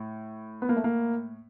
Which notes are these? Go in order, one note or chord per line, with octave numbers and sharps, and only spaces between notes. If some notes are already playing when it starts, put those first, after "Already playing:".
Already playing: A2
B3
A#3
A3
A#3